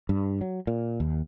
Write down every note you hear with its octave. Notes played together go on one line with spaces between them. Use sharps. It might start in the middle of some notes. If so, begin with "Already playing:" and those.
G2
F#3
A#2
D#2